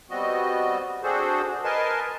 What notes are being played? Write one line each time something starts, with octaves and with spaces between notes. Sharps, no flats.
G3 B3 C4 F#4 D#5
C4 D4 F#4 G#4 A4 C5
A#4 B4 D#5 G#5 A5 C6